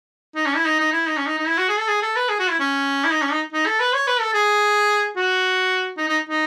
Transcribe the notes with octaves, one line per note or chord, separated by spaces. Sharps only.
D#4
C#4
E4
D#4
D#4
E4
D#4
C#4
D#4
D#4
E4
F#4
G#4
A4
G#4
A4
B4
G#4
F#4
E4
C#4
E4
D#4
C#4
D#4
D#4
A4
B4
C#5
B4
A4
G#4
F#4
D#4
D#4
D#4